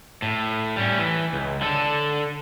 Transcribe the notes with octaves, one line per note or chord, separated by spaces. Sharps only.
A2
G3 C#4
E3
C#2
D3 A4